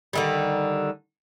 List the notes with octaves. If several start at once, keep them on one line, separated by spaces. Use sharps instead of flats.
D3 D#3 G3